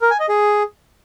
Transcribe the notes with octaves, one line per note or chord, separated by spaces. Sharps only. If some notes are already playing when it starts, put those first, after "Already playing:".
A#4
G#5
D#5
G#4